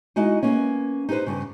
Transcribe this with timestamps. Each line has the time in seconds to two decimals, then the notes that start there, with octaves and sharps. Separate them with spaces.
0.16 G#3 D#4 E4 F#4 D#5
0.43 A#3 B3 C#4
1.09 D#4 G4 G#4 B4 C5
1.26 G2 C#3